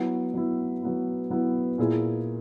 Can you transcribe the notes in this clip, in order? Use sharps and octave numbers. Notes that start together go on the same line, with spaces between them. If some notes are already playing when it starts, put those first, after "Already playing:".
Already playing: F#3 B3 E4
F#3 B3 E4
F#3 B3 E4
F#3 B3 E4
A#2 A#3 E4 G#4